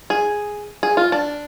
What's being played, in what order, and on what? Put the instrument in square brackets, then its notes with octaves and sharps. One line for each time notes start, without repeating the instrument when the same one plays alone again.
[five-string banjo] G#4
G#4
F4
D4